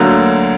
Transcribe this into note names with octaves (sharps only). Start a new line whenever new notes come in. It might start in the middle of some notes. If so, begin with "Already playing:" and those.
Already playing: D2 D3 F#3 A#3